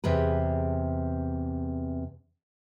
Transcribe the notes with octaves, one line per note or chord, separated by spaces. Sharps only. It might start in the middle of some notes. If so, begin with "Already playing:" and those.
E2 C3 G#4 B4